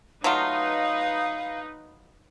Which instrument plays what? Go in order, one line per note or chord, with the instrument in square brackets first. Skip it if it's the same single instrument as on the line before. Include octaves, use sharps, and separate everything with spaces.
[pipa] F#3 A3 F4 [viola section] D#4 B4 [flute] F5